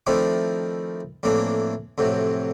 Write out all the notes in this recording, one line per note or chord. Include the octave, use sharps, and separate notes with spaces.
D#3 F3 A3 C4 D4 E4
F2 A2 E3 A#3 D4
F2 A2 C3 F#3